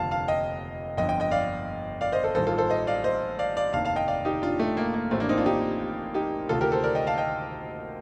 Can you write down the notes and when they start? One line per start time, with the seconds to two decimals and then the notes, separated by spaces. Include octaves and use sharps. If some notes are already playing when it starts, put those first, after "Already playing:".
Already playing: F1 D#2 D3 F3 F5 A5
0.11 F5 A5
0.28 D#5 G5
0.97 G1 F2 D3 D#5 G5
1.09 D#5 G5
1.20 D#5 G5
1.31 D5 F5
2.01 D5 F5
2.12 C5 D#5
2.24 A4 C5
2.35 A1 G2 D#3 A4 C5
2.47 F4 A4
2.58 A4 C5
2.70 C5 D#5
2.87 D5 F5
3.04 C5 D#5
3.39 D5 F5
3.56 D5 F5
3.73 F1 D#2 D#3 F5 A5
3.85 F5 A5
3.96 D#5 G5
4.08 D5 F5
4.25 D#4 G4
4.42 D4 F4
4.59 A3
4.77 A#3
4.94 A#3
5.11 A1 A2 F3 A3 C4
5.20 A#3 D4
5.29 C4 D#4
5.37 D4 F4
5.46 D#4 G4
6.14 D#4 G4
6.49 D2 C3 D#3 F4 A4
6.61 G4 A#4
6.72 A4 C5
6.84 A#4 D5
6.95 D#5 G5
7.07 F5 A5
7.18 D#5 G5